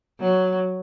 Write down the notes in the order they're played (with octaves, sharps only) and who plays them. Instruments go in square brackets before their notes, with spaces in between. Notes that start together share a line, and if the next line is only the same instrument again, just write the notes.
[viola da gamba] F#3